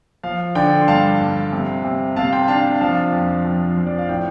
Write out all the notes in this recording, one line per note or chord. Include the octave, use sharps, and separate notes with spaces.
F3 F5
D3 D5 G5
C6
G2 F5 A5
G2
C3
C3
C3 F5 A5
G5 C6
D4 F5 A5
F3 F5 A5
F2
F3
F3
D5
F5
A2 D5 G5